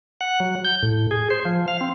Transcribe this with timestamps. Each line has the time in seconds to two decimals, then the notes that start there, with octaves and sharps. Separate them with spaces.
0.21 F#5
0.40 F#3
0.65 G6
0.83 A2
1.11 G#4
1.30 C5
1.45 F3
1.68 F5
1.81 C4